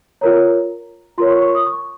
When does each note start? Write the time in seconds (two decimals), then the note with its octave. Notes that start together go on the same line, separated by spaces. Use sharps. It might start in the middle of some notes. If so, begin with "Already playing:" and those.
0.21 F4 A#4 C#5 A#5
1.18 F4 A#4 C#5 C6
1.31 C#6
1.42 C#6
1.55 D#6
1.66 C#6